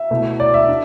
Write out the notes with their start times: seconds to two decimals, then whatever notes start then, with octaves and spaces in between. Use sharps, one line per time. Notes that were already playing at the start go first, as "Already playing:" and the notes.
Already playing: E5
0.11 B2 A3 E4
0.40 D5
0.54 E5
0.68 D4